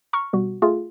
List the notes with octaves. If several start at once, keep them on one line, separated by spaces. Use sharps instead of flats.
A#5 C#6 F6
B2 G3 F#4
A3 F4 G#4